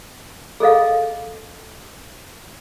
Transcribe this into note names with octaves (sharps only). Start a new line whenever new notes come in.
G#4 A4 D#5 F5